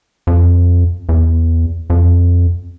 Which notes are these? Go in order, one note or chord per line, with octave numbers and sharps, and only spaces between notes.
F2
E2
F2